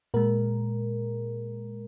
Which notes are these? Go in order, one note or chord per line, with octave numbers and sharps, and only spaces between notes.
A#2 G#3 A#4